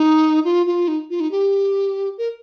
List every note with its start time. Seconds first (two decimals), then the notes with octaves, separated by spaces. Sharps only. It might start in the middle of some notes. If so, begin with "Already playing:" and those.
Already playing: D#4
0.45 F4
0.66 F4
0.88 D#4
1.10 F4
1.20 D#4
1.31 G4
2.18 A#4